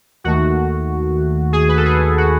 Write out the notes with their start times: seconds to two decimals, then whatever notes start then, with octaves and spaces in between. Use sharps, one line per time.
0.24 D#2 D#3 A3 F#4
1.53 G#4
1.69 B4
1.77 A4
1.85 G#4
2.18 F#4